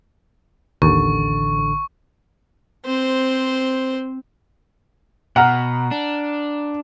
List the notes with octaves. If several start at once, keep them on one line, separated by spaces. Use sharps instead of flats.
A1 D#2 D3 C#6
C4 C5
B2 F#5 A#5 F6
D4